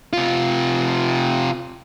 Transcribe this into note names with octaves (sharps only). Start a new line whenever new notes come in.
C3 F4